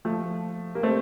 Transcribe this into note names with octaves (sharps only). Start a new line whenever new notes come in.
F3 A3
G3 A#3
A3 C4